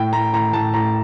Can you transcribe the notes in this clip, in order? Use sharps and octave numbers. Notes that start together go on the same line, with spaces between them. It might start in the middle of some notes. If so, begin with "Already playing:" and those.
Already playing: A2 G5
A2 A#5
A2 A#5
A2 A5
A2 A#5